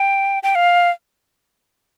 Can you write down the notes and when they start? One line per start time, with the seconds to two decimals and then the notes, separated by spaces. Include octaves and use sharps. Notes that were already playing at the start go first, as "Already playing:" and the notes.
Already playing: G5
0.43 G5
0.55 F5